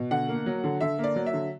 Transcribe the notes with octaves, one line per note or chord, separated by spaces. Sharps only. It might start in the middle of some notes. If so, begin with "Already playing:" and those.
Already playing: B2
D3 F#5
A#3
F#3
D3
D3 E5
A#3
D5
F#3
E5
D3